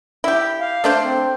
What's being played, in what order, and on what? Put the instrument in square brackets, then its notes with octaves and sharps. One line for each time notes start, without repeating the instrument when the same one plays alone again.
[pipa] E4 G4
[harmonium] F5
[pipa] A3 D4 C5
[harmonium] C4